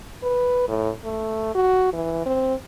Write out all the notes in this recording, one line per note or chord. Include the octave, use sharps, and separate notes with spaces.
B4
A2
A3
F#4
E3
C4